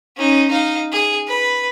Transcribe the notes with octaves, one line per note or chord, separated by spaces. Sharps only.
C#4 D#4
D#4 F5
G#4
B4